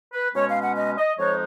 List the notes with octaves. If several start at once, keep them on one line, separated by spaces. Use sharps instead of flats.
B4
B2 G#3 C#4 C#5
F5
F#5
D#5
D#5
F2 F3 G#3 D#4 C#5